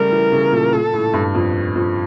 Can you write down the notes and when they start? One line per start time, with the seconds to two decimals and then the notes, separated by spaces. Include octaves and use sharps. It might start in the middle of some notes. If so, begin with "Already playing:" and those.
Already playing: C#3 G3 A3 A#4
0.12 E3
0.32 C#3
0.52 A#2
0.73 A#2 A4
0.94 A2
1.14 G2
1.35 F2
1.75 F2